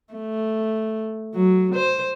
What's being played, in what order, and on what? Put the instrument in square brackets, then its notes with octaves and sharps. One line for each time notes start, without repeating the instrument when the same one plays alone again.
[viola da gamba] A3
F#3
C5